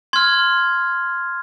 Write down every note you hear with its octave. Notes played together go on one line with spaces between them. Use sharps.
C6 F6 G#6